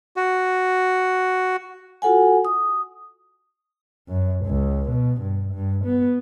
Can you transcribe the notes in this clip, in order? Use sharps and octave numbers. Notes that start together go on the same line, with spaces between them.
F#4
F4 F#4 A4 F#5 G#5
D#6
F#2
C#2
B2
G2
G2
B3